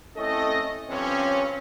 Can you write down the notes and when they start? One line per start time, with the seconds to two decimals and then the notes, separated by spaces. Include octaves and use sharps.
0.16 A3 C4 C#4 E4 A4 D#5
0.90 G2 F3 C4 C#4